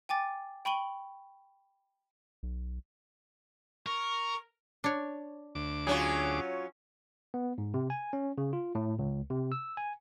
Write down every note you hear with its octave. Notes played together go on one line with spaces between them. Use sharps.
G5 G#5 D6 A6
G5 B5 C#6 D#7 F#7 G7
B1
A#4 C#6
D4 C#5
D2 D6
F#3 C#4 F4 G#4
B3
G#2
C3
G#5
C#4
C#3
F4
A2
C#2
C3
E6
G#5